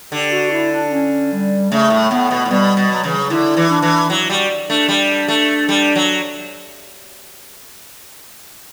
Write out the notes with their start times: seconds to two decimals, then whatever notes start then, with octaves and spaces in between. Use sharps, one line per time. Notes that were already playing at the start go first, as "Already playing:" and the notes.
0.12 D3 G4
0.31 F#4
0.51 E4
0.72 D4
0.92 C#4
1.32 G3
1.71 C#3 A3
1.90 A2
2.11 A2 B3
2.31 B2
2.45 A2
2.50 B2 G3
2.77 B2
2.91 F#3
3.04 C#3 E3
3.17 F#3
3.30 D3 E4
3.57 E3
3.70 D4
3.82 E3
4.09 F#3 E4
4.29 G3 F#4
4.69 A3 D4
4.89 G3
5.28 A3
5.69 G3
5.96 F#3